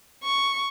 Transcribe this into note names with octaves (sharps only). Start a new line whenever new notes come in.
C#6